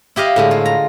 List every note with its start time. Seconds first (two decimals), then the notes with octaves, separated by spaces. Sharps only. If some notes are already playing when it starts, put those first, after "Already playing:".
0.16 E4 G4 D#5 F5
0.36 A2 D3 G#3
0.51 F4
0.65 A#5